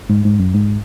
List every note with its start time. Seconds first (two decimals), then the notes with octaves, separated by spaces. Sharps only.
0.10 G#2
0.25 G#2
0.39 F#2
0.54 G#2